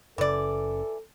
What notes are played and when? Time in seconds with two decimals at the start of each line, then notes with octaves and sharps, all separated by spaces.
0.18 F#1 C#3 E3 A4 D5